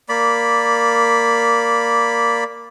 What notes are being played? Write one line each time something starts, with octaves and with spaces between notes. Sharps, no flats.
A#3 D5 B5